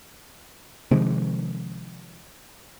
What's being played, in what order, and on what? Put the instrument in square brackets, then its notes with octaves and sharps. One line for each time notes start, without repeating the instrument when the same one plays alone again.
[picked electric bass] C3 D#3 F3 G#3